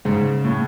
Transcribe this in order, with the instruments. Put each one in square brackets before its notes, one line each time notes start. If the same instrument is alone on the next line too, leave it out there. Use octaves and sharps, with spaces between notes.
[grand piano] G#2 [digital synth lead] C#3
[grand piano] A2